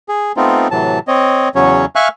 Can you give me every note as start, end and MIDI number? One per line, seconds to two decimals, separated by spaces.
0.09 0.32 68
0.37 0.68 57
0.37 0.68 59
0.37 0.68 60
0.37 0.68 63
0.37 0.68 65
0.71 0.99 45
0.71 0.99 48
0.71 0.99 52
0.71 0.99 54
0.71 0.99 81
1.08 1.49 60
1.08 1.49 73
1.08 1.49 75
1.55 1.85 40
1.55 1.85 49
1.55 1.85 54
1.55 1.85 61
1.55 1.85 73
1.95 2.08 76
1.95 2.08 77
1.95 2.08 80
1.95 2.08 85
1.95 2.08 89
1.95 2.08 90